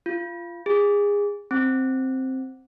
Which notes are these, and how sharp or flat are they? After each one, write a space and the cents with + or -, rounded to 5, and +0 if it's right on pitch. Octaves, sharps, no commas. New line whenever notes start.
F4 -20
G#4 -25
C4 +5